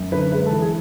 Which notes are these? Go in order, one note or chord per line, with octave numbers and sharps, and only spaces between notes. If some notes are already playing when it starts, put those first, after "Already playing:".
Already playing: F#2
D3 B4
G#3 B4
A4
E3
G#4